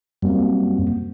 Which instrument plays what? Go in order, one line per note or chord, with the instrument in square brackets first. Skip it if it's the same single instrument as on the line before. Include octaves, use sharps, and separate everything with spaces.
[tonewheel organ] F#2 [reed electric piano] G3 A#3 C4